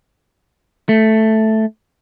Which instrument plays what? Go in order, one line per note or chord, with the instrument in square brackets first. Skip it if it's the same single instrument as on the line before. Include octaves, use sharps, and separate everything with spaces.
[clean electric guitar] A3